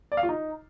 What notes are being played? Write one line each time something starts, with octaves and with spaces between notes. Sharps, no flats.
D5
F5
F4
D#4